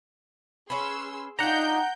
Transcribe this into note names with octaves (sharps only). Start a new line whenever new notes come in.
C#4 G#4 B4 C6 E6
D4 D#4 F4 F#5 G5 A#5 G6